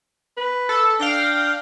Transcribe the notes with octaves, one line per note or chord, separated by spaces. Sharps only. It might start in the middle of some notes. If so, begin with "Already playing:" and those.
B4
A4
D4 F5 G5 A#6